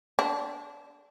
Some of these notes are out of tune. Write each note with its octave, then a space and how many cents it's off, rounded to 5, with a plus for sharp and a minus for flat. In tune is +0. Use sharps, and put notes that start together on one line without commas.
D4 -20